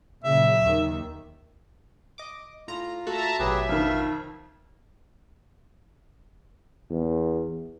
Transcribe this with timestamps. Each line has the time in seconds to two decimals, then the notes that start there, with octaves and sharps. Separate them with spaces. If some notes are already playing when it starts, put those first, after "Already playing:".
0.24 A#2 C#3 F#3 E5
0.60 D#2 D#3
2.18 D#5 D6
2.68 A2 F4 A#5
3.07 A3 F#4 A4 E5 A5 A#5
3.39 A1 B2 F#3 G4 G#4 B4 E5
3.69 F2 D#3 F5
6.90 E2